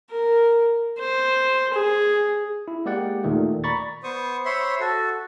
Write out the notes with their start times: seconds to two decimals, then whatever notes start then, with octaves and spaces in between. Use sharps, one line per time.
0.10 A#4
0.98 C5
1.73 G#4
2.68 E4
2.86 G#3 A#3 G4 D5 F#5
3.24 D#2 A#2 D#3 A3
3.64 D5 A#5 B5 C#6 A6
4.04 B3 C5 C#6 D#6
4.45 C5 C#5 E5 B5 C6
4.80 F#4 A4